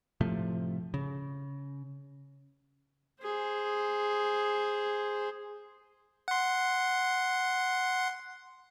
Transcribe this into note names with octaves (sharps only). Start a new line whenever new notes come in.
A2 C3 F3 A3
C#3
G#4 C5
F#5 C6